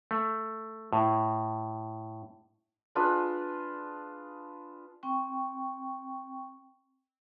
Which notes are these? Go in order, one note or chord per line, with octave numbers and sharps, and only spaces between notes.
A3
A2
D4 F4 G#4 B4
C4 G5 C#6